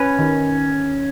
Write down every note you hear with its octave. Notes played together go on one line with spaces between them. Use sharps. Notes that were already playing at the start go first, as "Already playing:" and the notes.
Already playing: C#4 B4
D#3